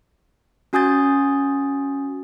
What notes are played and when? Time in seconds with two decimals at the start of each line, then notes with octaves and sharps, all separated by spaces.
0.73 C#4 F#4 G#5 D#6 G6 A6